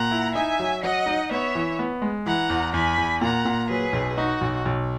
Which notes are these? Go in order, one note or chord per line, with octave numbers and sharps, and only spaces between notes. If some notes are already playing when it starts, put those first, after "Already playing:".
Already playing: A#2 F#5 A#5
E4
D#4 E5 G#5
F#3
F#3 D#5 F#5
D#4
B3 C#5 E5
E3
B3
G#3
E3 F#5 A#5
E2
E2 G#5 B5
E2
A#2 F#5 A#5
A#2
F#3 G#4 B4
B1
D#4 F#4
B1
B1